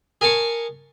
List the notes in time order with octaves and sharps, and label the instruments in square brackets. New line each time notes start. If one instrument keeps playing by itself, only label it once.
[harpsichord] G#4 A#4 G#5 A5 C#6